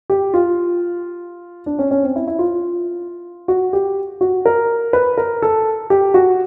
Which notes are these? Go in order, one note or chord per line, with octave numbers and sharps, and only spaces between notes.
G4
F4
D4
C#4
C#4
C4
E4
E4
F4
F#4
G4
F#4
A#4
B4
A#4
A4
G4
F#4